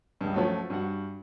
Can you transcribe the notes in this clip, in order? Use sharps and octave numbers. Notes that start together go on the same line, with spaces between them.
C#2 G2
F3 F#3 A3 C#4 F#4
G2 F#4 F#5